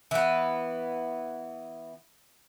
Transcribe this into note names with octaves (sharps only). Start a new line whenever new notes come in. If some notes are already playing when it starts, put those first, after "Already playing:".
E3 B3